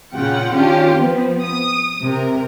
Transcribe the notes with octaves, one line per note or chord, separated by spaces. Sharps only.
A#2 C#3 F4 F#5 G5
D#3 C#4 D4 F4 G4
F3 B3 C4
D#6
C3 A#4